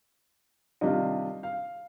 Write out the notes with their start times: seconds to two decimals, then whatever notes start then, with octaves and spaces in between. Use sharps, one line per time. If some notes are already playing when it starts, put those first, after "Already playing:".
0.81 C3 D#3 G3 D4 F4 D#5
1.43 F5